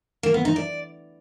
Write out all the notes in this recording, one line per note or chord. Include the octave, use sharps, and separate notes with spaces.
A#3
B3
D#4
D5